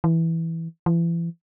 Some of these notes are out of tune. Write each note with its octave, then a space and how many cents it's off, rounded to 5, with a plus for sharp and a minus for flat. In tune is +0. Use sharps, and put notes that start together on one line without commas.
E3 -5
E3 +35